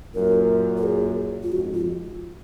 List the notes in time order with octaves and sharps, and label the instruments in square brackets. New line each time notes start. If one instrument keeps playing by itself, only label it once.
[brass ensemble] F#2 A#2 [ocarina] A#4
[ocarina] A#4
G#4
F4
[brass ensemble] F2 G#2 [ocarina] F#4
[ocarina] F4